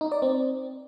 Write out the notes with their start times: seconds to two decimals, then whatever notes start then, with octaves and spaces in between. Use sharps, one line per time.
0.01 D#4
0.12 D5
0.22 C4